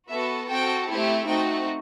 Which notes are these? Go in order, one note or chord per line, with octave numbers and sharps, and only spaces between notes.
B3 F#4 A4 E5
C4 F#4 A4 G5
A3 C4 E4 G4
A3 C4 D#4 F#4 G5